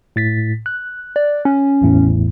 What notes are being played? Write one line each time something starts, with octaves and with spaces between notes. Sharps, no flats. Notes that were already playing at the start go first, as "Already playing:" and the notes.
A2 A6 B6
F#6
D5
C#4
A1 E2 A2